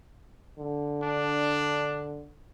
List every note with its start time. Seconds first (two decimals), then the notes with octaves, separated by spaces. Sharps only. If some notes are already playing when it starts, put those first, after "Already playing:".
0.59 D3
1.03 D4